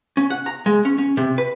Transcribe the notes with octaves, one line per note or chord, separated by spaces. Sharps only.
C#4
F#5
A#5
G#3
C#4
C#4
C3
B4